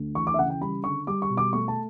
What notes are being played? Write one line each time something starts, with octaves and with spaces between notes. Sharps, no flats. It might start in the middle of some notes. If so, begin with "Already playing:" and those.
Already playing: D2
E3 C#6
D6
E5
C#3 F#5
G5
G3 B5
D3 C#6
G3 D6
C#6
B2
D6
A3 C#6
A5